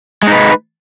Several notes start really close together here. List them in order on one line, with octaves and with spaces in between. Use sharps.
G#3 D#4 B4